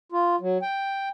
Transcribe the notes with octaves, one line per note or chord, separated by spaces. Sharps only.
F4
F#3
G5